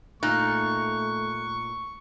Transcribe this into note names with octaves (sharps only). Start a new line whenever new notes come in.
A#2 A3 D#4 C#6 F#6